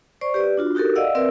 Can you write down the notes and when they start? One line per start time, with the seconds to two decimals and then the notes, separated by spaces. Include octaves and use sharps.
0.21 C5 D5 C#6
0.34 G4 B4 D5
0.57 D4 F4 F#4
0.75 D#4 F#4 G4 A4 A#4
0.95 D5 D#5 F5 F#5 E6
1.15 C4 A#4 B4 D5 E5 E6